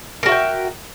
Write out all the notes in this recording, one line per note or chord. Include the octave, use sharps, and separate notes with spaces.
F#4 A#4 E5 G5